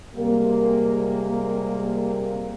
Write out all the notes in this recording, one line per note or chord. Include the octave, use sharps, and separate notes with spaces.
C3 G3 G#3 A#3